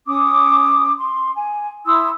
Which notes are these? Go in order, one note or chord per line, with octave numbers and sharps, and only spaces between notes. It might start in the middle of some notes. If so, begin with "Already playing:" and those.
C#4 D6 D#6
C6
G#5
E4 C6 D#6 E6